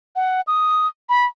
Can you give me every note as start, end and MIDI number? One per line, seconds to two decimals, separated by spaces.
0.16 0.41 78
0.47 0.87 87
1.09 1.26 83